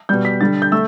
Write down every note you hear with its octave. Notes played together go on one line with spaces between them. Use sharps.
B2 G3 G6
B6
D3 G3 A6
G6
A3 E6